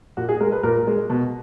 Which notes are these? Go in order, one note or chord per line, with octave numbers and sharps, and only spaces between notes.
A#2 F#4
G#4
G#3 A#4
B4
A#2 A#4
G#3
B2